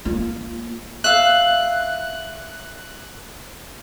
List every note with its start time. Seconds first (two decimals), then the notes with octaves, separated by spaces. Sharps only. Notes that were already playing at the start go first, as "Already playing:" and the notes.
0.05 A#3 F4
1.04 E5 F5 F#6